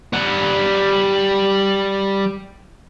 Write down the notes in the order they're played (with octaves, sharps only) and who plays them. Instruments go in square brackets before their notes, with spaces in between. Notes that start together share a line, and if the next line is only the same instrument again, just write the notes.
[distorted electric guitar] G3 F#5